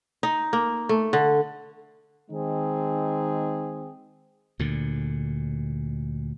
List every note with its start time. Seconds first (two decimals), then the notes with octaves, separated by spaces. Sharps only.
0.23 D#4
0.53 A#3
0.89 A3
1.13 D3
2.31 D#3 G#3 C4 D#4 G#4
4.59 D2 A#2 D3